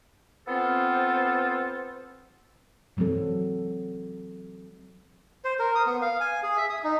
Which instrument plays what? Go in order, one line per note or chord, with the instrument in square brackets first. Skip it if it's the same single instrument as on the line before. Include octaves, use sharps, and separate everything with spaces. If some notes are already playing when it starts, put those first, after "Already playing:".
[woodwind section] B3 C4 F4 A4 C5
[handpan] E3 F#3 G#3 C4 A4
[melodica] C5
A#4
D#6
B3
F5
G#5
G#4
E5
D#6
D#4